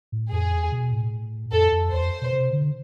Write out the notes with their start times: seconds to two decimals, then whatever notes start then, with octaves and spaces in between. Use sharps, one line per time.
0.12 A2
0.31 F2 G#4
0.52 E2
0.72 B2
0.92 A2
1.52 F2 A4
1.72 F2
1.92 E2 C5
2.01 F2
2.22 B2
2.32 C3
2.53 D3